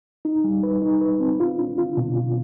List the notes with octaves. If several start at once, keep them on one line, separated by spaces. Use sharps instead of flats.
D#4
G3
B4
D#4
B4
C4
F4
D4
F4
B2
F4